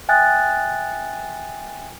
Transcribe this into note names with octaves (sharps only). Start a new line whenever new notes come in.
E5 G5 G#5 D#6 F#6 A6